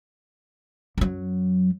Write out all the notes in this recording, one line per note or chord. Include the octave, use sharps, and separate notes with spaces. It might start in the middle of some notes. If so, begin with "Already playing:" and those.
F#2 F#3